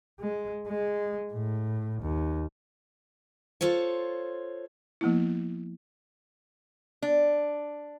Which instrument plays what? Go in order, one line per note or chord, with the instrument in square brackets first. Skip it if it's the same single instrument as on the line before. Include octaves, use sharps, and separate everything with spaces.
[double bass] G#3
G#3
A2
D#2
[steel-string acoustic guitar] F4 A4 C5 C#5
[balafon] F3 A#3 B3 E4
[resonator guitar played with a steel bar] D4